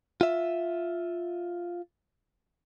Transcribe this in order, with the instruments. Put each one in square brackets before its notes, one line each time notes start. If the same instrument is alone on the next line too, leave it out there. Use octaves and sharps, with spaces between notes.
[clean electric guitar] F4 E5